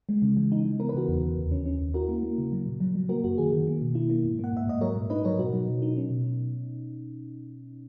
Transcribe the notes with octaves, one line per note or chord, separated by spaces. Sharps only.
G#3
C#3
E3
D#4
E3
B3 A#4
B4
C#3 F#4 A#4
E2
C#3
D#2
C#4
C#4
D#2
E4 F#4 A#4
A#3
A#3
C#3
F#3
A#2
F#3
F#3
A#3 F#4 A#4
F#2 F#4
D#3 G#4
D#3
A#3
B2
E4
A#3
G#2
A#3 F#5
G#2 E5
G#2 D#5
F#3 A#4 C#5
A#2
D#4 B4 D#5
F#3 A#4 C#5
B2 F#4 A#4
F#3
B2
D#4
C#4
B2